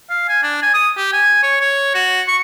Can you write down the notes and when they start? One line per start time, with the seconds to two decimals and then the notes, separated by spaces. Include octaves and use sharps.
0.10 F5
0.29 G#5
0.43 D4
0.62 G#5
0.74 D#6
0.97 G4
1.13 G#5
1.43 C#5
1.61 C#5
1.94 F#4
2.28 C#6